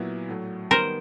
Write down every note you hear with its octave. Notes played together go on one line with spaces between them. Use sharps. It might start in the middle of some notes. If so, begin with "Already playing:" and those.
Already playing: A#2 F#3 B3 E4
A2 F#3 A3
D#3 G3 B3 A#4 C5